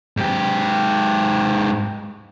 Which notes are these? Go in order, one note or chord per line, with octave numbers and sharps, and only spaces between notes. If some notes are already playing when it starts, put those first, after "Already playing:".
G#2 G4